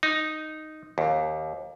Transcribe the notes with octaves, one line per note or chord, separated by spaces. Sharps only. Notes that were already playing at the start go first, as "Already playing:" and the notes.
D#4
D#2